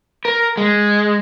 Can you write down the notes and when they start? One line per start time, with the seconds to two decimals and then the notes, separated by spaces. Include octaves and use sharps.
0.25 A#4
0.57 G#3